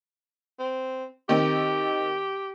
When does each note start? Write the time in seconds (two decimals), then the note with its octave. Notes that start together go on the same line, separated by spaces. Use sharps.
0.59 C4
1.29 D#3 C4 G4